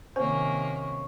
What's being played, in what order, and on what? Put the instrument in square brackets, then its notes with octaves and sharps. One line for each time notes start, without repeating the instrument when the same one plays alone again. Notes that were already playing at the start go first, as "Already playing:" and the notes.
[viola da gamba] C3 D#3 A#3 [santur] C#4 [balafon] C5